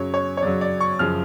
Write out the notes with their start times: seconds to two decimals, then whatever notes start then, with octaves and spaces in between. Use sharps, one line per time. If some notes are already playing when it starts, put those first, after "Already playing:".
Already playing: F#2 C#3 F#3 C#5
0.14 C#5
0.37 C#5
0.42 F#2 C#3 F#3 D5
0.61 D5
0.81 C#6
0.99 F#2 C#3 F3 F6